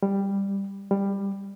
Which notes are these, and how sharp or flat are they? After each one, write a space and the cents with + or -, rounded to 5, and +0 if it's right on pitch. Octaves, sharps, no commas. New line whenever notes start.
G3 +10
G3 +15